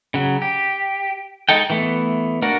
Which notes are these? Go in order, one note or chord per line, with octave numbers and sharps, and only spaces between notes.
C#3 F#3
G4
G#3 D#4 A4 G5
E3 A3 B3
A#3 D4 F#4 A#4